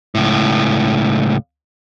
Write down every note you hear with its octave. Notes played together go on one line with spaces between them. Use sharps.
C#2 A2